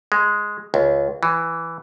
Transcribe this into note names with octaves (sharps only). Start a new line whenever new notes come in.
G#3
C#2
E3